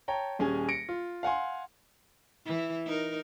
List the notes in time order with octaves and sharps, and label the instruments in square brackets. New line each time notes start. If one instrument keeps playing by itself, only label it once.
[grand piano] C#5 G5 A5 A#5
D#1 C#4 G#4 G#5
A#6 C#7 D7
F4
F5 F#5 G#5 C6
[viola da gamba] E3 E4
D#4 A#4